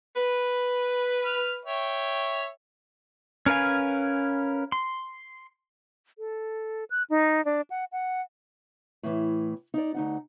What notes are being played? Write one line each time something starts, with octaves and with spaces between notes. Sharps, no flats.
B4
F6
C#5 E5 G5
C#4 A#4 B4 F5 G#5
C6
A4
F#6
D#4
D4
F#5
F#5
A2 E3
D#4 D5
D2 D#4 F#5